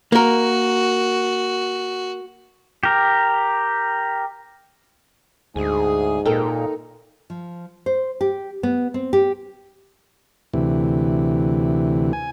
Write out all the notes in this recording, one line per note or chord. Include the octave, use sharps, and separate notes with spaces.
A#3 F#4 A#4
G4 A#4
D2 G#2 G#4 G#5
A#2 D#4 A4 A#4 G5
F3
C5
G4
B3
C4
G4
D2 C3 E3
G#5